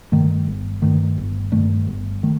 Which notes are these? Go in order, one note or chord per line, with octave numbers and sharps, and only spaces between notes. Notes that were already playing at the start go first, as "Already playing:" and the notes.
G2 D#3 A3
G1
G2 D#3 A3
G1
G2 D#3 A3
G1
D#3 A3